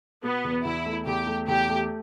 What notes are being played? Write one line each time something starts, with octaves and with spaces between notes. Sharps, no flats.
B2 B3
E2
E2 E4
A3
E2 G4
A3
E2 G4
A3